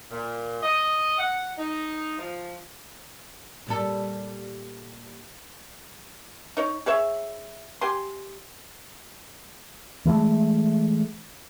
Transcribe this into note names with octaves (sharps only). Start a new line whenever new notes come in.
A#2
D#5
F#5
D#4
F3
A#2 G3 A4
D#4 C#5
G#4 C#5 E5
G4 G#5 C6
E3 F3 G#3 A3